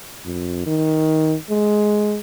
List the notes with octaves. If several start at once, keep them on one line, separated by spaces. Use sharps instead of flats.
F2
D#3
G#3